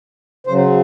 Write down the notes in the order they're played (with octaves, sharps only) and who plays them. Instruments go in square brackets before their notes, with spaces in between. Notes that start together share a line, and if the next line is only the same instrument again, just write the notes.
[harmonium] C#3 F#3 C5